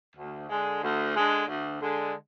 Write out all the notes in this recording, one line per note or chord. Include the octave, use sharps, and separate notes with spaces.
D2
D3 G#3
D2
D3 G#3
D2
D3 G#3